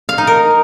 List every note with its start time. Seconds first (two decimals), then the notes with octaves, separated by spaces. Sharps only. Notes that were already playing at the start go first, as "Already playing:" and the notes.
0.09 F5
0.18 D#4
0.27 A#4